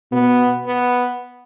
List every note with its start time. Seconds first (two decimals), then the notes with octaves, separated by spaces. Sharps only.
0.12 B2 B3
0.67 B3